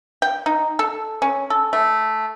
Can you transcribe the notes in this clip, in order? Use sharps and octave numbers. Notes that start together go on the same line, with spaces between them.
G5
D#4
A4
C#4
A4
A3